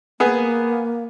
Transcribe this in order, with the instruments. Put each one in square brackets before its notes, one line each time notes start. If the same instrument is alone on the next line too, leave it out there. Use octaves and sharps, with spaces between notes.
[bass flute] A#3 [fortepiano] B3 G#4